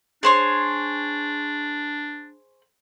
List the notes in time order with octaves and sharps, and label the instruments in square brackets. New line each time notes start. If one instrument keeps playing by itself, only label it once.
[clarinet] D4 [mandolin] G#4 C5 C#5